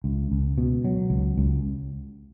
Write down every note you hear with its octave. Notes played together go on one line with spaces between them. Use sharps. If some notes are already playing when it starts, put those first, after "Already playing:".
C#2
C#2
B2
F#3
C#2
C#2